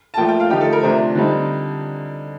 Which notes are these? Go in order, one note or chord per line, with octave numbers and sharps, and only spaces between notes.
A5
A#2 F3 A3 G5
G5
F5
D3 F3 A3 D#4 G4
A4
A#4
C3 F3 A3 D4 C5
D3 G3 C4 D#4